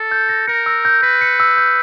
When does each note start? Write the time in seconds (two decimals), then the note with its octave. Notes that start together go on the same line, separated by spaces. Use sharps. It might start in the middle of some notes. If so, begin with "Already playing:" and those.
Already playing: A4
0.11 G6
0.29 A#6
0.48 A#4 C#7
0.66 E6
0.85 G6
1.03 B4 A#6
1.21 C#7
1.40 E6
1.57 G6